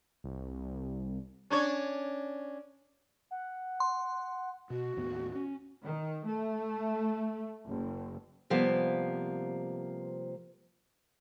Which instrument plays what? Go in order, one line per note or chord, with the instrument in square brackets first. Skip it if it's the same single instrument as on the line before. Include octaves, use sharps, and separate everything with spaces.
[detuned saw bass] C2
[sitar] C#4 D4 C#5
[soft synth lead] F#5
[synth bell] C6
[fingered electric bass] B2 [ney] F#4
[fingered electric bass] D#2 A2 B3
C#4
[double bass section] D#3
A3
F#1
[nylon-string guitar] C3 F3 G3 A#3 B3